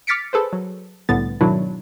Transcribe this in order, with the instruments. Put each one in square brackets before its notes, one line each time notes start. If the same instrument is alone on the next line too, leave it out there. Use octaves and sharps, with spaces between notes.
[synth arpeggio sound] D6 F6 A6 B6 C#7 D7
G#4 A4 B4 C5
F#3
C2 A2 D3 B3 A6
G#2 B2 D#3 F#3 D4 E4